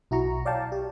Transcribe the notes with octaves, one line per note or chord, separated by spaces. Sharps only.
B1 E4 F#4 A#5 C#6
C#5 D5 F5 G5 A5
G4